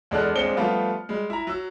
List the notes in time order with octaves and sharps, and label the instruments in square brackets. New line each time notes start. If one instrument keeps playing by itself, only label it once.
[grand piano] E2 G#3 D4 A4 F6 F#6
D#1 G#3 C4 D4 C#7 G7
F3 G3 A3 B3 F4
G3 G#3
E4 A#5
F#3 E6